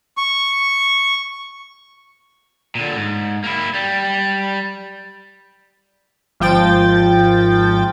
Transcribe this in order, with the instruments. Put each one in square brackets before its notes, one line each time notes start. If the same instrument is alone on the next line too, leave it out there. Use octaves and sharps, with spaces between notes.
[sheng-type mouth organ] C#6
[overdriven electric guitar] A#2 D3
G#2
A#3 E4
G3
[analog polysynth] G#1 F3 G5 A6